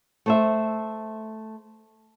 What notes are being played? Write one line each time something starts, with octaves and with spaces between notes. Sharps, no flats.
A3 C5 E5